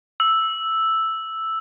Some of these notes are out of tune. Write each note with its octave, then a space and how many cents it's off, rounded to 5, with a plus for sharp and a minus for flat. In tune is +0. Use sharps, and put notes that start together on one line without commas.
E6 +0